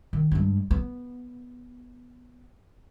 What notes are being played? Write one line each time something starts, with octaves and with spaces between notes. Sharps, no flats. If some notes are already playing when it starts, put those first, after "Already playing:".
D#3
G2 G#3
B3